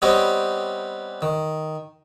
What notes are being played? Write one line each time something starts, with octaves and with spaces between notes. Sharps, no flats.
G3 B3 C4 G4 C#5 D#5
D#3